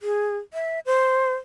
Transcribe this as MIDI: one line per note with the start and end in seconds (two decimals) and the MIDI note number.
0.01 0.37 68
0.54 0.80 76
0.86 1.34 72